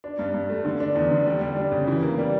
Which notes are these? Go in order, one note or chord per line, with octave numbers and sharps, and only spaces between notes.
D4
G2
G2
A3
D3
D4
E2
D3
G3
G3
D4
C#3
E3
A#3
G3